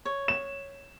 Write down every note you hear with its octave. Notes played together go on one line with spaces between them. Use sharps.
C#5
E7